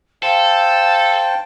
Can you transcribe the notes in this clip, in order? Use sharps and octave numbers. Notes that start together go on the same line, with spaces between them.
A4 C5 F5 G5 A5